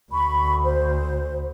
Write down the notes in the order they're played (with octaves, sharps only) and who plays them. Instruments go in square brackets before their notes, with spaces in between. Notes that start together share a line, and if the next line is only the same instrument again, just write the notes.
[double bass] D2 [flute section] B5 C#6
[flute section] C5